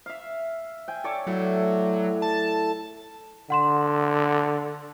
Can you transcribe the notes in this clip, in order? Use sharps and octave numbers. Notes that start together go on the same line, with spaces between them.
E5 F5
G5 G#5
A4 C#5 D5
A2 F#3
A5
D3 F#5 C6 E7